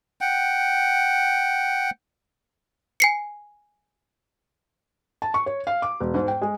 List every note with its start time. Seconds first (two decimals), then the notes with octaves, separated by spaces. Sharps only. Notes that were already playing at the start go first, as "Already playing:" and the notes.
0.21 F#5 G5
3.00 G#5 C7 C#7
5.22 A5
5.34 C#6
5.46 C#5
5.67 F5
5.82 D6
6.00 E1
6.14 G#2
6.28 G5
6.41 G#3